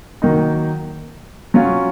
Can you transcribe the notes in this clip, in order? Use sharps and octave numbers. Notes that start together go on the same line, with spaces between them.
D#3 F#3 A#3 D#4
F#3 C#4 F4